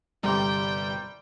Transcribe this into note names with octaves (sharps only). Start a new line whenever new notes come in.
G1 C3 G3 G5 A#5 C6 D6